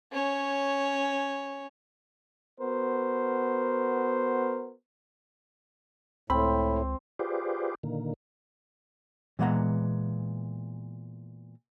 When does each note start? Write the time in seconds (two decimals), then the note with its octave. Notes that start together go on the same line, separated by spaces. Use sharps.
0.12 C#4 C#5
2.59 B3 F#4 A#4 C5
6.30 C#2 A2 C4 B5
7.19 F4 G4 G#4 B4 C5 D5
7.83 A#2 D3 D#3 A#3
9.39 A#2 E3 G#3 B3 F#5 A#5